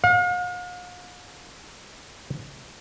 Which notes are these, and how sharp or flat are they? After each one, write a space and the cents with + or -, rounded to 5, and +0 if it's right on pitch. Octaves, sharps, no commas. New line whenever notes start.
F5 +45